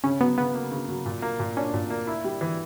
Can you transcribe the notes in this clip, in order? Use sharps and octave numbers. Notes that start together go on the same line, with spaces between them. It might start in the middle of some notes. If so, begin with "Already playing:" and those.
C#3 C#4
F#3 B3
C#3 B3
A#3
C#3
F#3
A#2
A#3
A#2
C#4 D4
A#2
A#3
E4
G3
E3